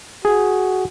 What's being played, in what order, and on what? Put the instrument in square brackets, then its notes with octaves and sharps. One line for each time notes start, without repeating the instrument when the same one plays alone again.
[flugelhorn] F#4 [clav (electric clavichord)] G#4